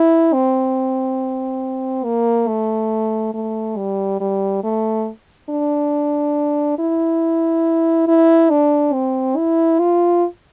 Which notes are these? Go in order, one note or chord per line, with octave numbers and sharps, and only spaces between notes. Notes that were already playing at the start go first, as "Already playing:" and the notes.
Already playing: E4
C4
A#3
A3
A3
G3
G3
A3
D4
E4
E4
D4
C4
E4
F4